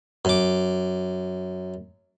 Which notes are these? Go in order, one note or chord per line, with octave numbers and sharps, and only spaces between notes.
F#2 D6